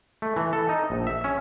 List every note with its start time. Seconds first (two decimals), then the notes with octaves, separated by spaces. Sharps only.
0.22 A3
0.36 E3
0.53 A4
0.69 D#4
0.90 A#1
1.07 E5
1.24 C#4